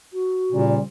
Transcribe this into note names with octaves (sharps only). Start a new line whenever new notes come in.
F#4
A#2 C#3 F3 G3